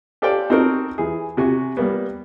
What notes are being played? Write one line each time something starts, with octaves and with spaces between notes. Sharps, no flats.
G4 A4 C5 D5 F5 G5
C4 D#4 F#4 A4 A#4
E3 G#4
C3 F#4 G#5
G3 A#3 B3